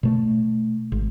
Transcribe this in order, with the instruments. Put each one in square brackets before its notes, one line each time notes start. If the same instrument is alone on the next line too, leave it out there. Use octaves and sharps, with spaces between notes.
[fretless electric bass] B2 A3
G#1